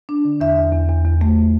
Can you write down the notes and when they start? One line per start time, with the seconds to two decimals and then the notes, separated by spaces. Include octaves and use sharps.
0.09 D4
0.25 D3
0.41 E2 E5
0.58 E2
0.72 E2
0.89 E2
1.05 E2
1.21 A3